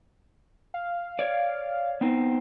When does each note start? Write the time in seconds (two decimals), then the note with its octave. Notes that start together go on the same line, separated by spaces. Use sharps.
0.74 F5
1.19 C#5 D5
2.01 B3 C4 D#4